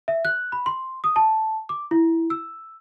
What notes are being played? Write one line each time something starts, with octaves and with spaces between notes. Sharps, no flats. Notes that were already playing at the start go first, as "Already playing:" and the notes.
E5
F#6
B5
C6
D#6
A5
D6
E4
E6